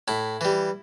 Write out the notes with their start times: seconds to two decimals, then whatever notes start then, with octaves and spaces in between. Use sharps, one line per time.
0.08 A2 E4
0.41 E3 G3